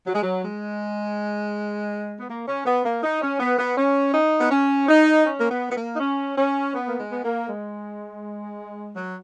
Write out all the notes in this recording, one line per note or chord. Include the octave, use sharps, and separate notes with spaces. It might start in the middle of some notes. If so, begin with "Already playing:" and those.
F#3
G#3
F#3
G#3
B3
A#3
C#4
B3
A#3
D#4
C#4
B3
B3
C#4
D#4
B3
C#4
D#4
C#4
A#3
B3
B3
A#3
D#4
C#4
C#4
B3
A#3
G#3
B3
A#3
G#3
F#3